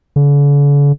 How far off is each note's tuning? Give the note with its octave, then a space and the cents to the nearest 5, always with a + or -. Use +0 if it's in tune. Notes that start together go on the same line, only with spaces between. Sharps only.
D3 -45